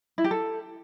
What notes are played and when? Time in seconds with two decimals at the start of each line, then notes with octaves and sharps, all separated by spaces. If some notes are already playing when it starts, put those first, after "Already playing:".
0.18 E4
0.24 G4
0.31 A4